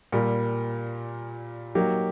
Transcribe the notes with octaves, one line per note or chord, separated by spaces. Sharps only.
A#2 G3 A#3
F#3 A#3 D#4 G4